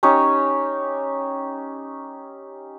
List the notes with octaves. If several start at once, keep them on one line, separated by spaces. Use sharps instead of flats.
C#4 D#4 G4 C#5